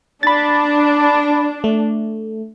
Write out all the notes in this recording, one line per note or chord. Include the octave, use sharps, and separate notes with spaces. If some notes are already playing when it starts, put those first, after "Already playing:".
D4 B5 A6
A3